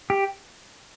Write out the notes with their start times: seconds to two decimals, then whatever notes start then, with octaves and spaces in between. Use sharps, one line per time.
0.10 G4